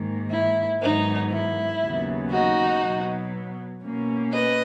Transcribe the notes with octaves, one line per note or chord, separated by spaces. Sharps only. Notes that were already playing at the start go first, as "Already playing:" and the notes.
Already playing: G#2 D#3 A#3
E4
G#2 D#3 F#3 B3 D#4
E4
D#2 C#3 F#3 B3
D#4 F#4
B2 F#3 B3
B2 A#3 C#4
B4 D#5